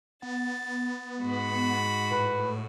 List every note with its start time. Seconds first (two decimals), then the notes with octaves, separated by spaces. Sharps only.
0.22 B3 A6
1.21 G#2 F#4 B5
2.11 A2 B4